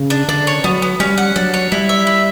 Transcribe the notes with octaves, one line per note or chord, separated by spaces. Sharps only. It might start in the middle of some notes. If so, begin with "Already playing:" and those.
Already playing: C#3
D4
D3 D4
C#5
F#3 B3
B3
G3 C#4
F#5
F#3 D4
C#5
G3 E4
E5
E4